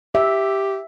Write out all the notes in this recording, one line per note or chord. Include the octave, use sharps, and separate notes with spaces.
G4 E5